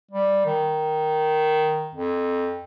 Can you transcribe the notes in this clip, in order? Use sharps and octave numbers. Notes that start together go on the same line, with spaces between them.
G3
D#3
F2